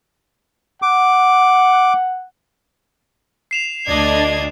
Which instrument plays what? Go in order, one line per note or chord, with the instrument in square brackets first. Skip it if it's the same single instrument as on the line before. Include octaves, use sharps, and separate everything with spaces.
[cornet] F#5 [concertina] D6
[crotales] C7 E7 F7
[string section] D2 D4 [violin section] D5 D#5 G#6